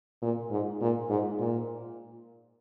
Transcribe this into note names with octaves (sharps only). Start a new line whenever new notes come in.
A#2
G#2
A#2
G#2
A#2